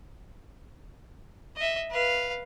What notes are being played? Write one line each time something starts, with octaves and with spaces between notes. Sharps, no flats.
D#5 E5
B4 F5